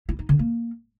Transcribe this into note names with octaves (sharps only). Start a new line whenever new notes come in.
E4
D#4
D3
A#3